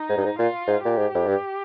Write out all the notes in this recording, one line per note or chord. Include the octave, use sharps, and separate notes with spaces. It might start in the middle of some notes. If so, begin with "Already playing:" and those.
Already playing: D#4
G#2
G2
G#2
A#2 F4
G#2
A#2 G4
G#2
F2
G2